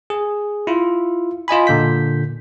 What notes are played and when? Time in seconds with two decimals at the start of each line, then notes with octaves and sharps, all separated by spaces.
0.10 G#4
0.67 E4 F4
1.48 F4 D#5 G#5 B5
1.67 A#2 D3 G6 B6